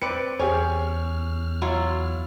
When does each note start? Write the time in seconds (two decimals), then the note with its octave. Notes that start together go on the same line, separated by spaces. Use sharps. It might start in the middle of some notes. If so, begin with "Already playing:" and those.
0.02 C4 B4 D5 C#7
0.39 E2 C#4 G4 G#4 C#5 F6
1.62 F#3 E4 F4